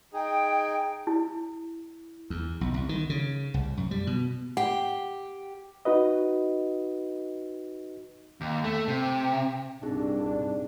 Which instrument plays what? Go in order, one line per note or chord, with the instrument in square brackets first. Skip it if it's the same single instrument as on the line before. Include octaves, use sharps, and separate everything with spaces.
[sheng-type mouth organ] D#4 G#4 [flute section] G5
[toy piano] E4
[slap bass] E2
B1
C2
D#3
C#3
C2
F#2
G3
B2
[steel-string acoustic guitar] G4 [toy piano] F#5
[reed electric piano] D#4 F#4 B4 D#5
[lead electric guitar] D#2
A3
C3
[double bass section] C2 G2 A#2 [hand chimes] C4 D#4 G#4 [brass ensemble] D4